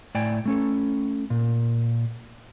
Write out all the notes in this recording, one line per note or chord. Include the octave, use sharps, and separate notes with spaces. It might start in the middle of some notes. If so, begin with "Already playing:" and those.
A2 D5 G5 G#5
A3 C#4 A4
A#2